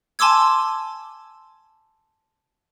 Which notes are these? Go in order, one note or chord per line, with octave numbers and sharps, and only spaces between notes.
G#5 A5 C6 D6 E6 G#6